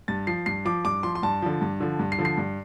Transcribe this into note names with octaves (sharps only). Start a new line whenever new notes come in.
G2 A6
F3 C7
G2 C7
F3 D6
G2 D6
F3 C6
C6
G2 A5
D3 F3
G2
D3 F3
G2
C7
D3 F3
C7
G2